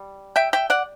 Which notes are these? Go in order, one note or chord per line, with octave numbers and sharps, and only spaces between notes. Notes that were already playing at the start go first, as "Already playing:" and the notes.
Already playing: G3
E5 G5
E5 G5
D5 F#5